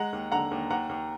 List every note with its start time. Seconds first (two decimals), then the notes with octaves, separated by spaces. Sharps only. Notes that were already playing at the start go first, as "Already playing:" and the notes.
Already playing: G#3 F#5 A#5
0.13 D#2
0.32 D3 F#5 A#5
0.51 D#2
0.70 D#2 F#5 A#5
0.89 D#2